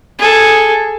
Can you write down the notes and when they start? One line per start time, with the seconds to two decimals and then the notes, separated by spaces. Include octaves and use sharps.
0.19 G#4 A4